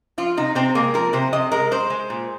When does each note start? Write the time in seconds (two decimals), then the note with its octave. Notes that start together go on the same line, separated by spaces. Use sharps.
0.18 F3 F4
0.37 C3 D#4
0.55 C3 C4
0.75 G#3 A#3
0.94 F3 A#4
1.13 C3 C5
1.33 C3 D#5
1.52 G#3 A#4
1.71 G#3 C5
1.90 G#3
2.10 A#2